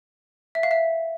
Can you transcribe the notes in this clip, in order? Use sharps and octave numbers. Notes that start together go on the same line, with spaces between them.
E5
F5
E5